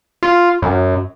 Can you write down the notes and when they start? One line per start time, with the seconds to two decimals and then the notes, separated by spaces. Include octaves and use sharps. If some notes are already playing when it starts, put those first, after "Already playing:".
0.23 F4
0.62 F#2